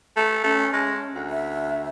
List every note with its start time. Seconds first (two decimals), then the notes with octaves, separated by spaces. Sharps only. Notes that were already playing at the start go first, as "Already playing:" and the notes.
0.16 A3
0.44 A3 C#4
0.73 G#3
1.15 D2
1.29 E5